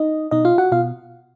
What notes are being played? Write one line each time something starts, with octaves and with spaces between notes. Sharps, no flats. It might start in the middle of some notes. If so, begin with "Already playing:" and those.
Already playing: D#4 D#5
B2 D#4 D#5
F4 F5
F#4 F#5
B2 F4 F5